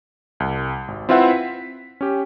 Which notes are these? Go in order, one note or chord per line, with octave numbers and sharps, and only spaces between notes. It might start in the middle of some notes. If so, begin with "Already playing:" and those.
C2
G#1
C4 E4 F4 B4 E5 F#5
B6
C#4 G4